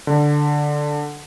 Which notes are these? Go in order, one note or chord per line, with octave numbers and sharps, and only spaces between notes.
D3